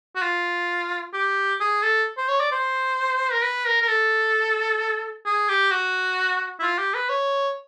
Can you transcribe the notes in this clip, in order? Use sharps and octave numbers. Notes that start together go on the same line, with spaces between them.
F#4
F4
G4
G#4
A4
C5
C#5
D5
C5
A#4
B4
A#4
A#4
A4
G#4
G4
F#4
E4
F4
G4
B4
C#5